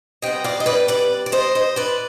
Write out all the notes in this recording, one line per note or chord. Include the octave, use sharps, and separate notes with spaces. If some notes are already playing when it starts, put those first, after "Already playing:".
C3 G3 B3 D#5 G5
D5 F5
D#5
B4 D5
B4 D5
D5
C5 D#5
C5 D#5
B4 D5